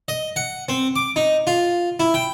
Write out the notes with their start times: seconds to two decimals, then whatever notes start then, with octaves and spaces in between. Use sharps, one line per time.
0.08 D#5
0.36 F#5
0.69 C4
0.96 D6
1.16 D#4
1.47 F4
2.00 E4
2.14 G5